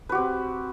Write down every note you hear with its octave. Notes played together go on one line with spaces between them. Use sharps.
C4 F#4 G4 B4